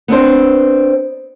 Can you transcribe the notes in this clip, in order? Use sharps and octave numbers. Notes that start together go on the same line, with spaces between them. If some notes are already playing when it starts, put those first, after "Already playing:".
B3 C4 D4 C5